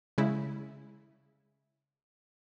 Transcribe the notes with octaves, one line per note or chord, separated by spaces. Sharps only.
C#3 G#3 E4